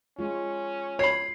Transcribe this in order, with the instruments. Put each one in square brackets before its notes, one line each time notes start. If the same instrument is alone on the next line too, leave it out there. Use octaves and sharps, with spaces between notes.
[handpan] G#3 F4 [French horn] C#4
[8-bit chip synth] C#5 B5 [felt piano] C7